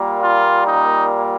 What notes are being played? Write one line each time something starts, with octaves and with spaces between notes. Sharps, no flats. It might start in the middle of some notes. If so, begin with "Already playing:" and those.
Already playing: A#2 G3 A#3
F4
D#4